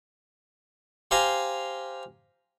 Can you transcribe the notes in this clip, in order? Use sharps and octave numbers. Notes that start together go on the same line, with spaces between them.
G4 C5 F5 G#5 A#5